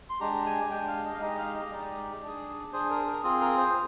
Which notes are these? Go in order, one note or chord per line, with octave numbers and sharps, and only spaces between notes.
C6
G#3 D4 G4 A#5
G#5
G#3 D4 G4 G5
F5
D#5
F5
G#3 D#4 G4 D#5
F5
D#5
G#3 D#4 G4 D5
D4 G#4
D4 G#4 C5
A#4
A#4
C4 F4 G#4
A#4
C5